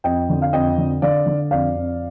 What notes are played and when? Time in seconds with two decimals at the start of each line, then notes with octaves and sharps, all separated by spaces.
0.04 F2 D#5 G5
0.29 D3
0.42 F5
0.53 F2 D#5 G5
0.78 D3
1.02 D3 D5 F5
1.26 D3
1.51 F2 D5 F5
1.75 F2